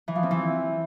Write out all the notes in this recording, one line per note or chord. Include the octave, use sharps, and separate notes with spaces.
E3
F3
C4
E3